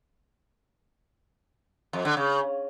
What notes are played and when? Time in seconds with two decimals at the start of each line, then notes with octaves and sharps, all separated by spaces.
1.93 F2
2.05 D3
2.17 C#3